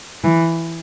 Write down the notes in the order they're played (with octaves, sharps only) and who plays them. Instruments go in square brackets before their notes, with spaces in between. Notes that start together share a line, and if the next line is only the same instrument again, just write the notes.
[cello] E3